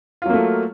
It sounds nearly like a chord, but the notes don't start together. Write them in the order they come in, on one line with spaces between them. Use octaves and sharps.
F4 F#3 A#3 A3